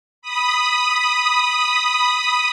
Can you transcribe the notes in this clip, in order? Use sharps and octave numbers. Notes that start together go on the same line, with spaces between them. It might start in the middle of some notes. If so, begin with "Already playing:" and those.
B5 D#6